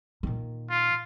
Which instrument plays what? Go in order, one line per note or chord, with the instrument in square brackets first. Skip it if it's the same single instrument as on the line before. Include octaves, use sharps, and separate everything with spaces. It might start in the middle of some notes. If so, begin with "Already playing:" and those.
[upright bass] A#2 D#3
[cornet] F4